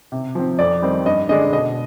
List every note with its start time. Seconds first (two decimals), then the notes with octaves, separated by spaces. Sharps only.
0.12 C3
0.35 F3 C4
0.59 F2 D5
0.82 D#3 G3 C4 D#4
1.06 G2 D#5
1.29 D3 G#3 D4 D#5
1.53 B2 D#5